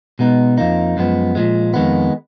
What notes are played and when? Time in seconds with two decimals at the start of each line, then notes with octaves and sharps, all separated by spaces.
0.19 B2 G#3 B3 D#4
0.58 F2 F3 A#3 D#4
0.97 F#2 F3 G#3 B3
1.35 A#2 F3 G#3
1.74 F2 D#3 G#3 B3